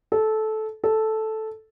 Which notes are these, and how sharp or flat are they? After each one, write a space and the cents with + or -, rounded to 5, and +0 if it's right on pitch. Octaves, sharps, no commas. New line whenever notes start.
A4 -15
A4 -5